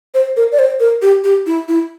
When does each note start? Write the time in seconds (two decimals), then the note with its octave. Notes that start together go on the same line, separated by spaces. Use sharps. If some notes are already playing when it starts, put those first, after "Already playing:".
0.14 C5
0.37 A#4
0.52 D5
0.59 C5
0.80 A#4
1.02 G4
1.24 G4
1.46 E4
1.68 E4